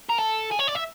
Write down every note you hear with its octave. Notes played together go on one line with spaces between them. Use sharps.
A#4
A4
G#4
C#5
D5
E5